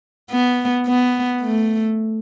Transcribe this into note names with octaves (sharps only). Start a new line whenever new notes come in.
B3
B3
A3